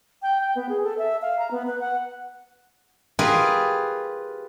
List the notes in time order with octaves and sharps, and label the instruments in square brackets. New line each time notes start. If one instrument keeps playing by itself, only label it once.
[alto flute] G5
G5
B3
G#4
A4
E5
F5
A#5
B3
B4
F#5
[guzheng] F4 G4 G#4 A#4 B4